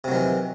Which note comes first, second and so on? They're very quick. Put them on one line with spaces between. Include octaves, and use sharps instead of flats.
C3 F#3 D#3 E3